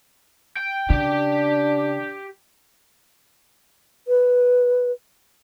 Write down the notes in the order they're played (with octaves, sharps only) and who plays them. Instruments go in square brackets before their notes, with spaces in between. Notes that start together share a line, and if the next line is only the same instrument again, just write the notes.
[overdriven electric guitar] G5
[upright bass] C#3 [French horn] D4 [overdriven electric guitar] G4 G5
[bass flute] B4